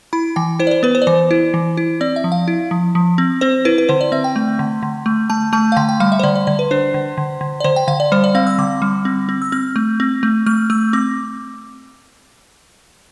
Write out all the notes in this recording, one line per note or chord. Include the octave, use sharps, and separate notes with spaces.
E4 B5
E3 G5
E4 C5
D5
C5
B3 B4
C5
D5
E3 C5
E4
E3
E4
C4 D5
E5
F3
F5
E4
F3
F3
C4
C4 C5
E4 B4
B4
D3 C5
D5
C4 E5
G5
A3
D3
D3
A3
A3 A5
A3 A5
F5
D3 G5
G5
G3 F5
E5
C5
D3 D5
D5
D3 D5
B4
D4 C5
D3
D3
D3
D5
D3 C5
G5
D3 F5
D5
G3 C5
D5
C4 F5
E6
D3 D6
G3
C4
C4
E6
C4 F6
A3
C4
A3
A3 F6
A3 E6
C4 D6